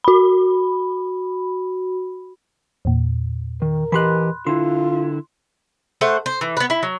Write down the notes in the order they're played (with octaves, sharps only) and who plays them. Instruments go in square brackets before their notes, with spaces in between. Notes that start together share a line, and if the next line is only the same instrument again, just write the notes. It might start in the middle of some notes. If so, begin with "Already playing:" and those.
[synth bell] F#4 B5
[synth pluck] E2 A#2
[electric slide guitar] D#3 [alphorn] A#4
[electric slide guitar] E3 G4 D#5 [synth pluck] B5 C6 F#6
[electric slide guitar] D3 E4 [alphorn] F4 [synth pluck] C6
[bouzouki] A3 C5 F#5
C5
E3
B3 B4
E4
F#3